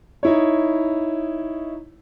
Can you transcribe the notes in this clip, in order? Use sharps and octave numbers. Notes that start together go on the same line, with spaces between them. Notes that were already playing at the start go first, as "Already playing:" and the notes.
D#4 E4 C#5